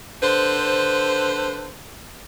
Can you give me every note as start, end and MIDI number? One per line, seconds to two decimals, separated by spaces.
0.23 1.75 50
0.23 1.75 71
0.23 1.75 72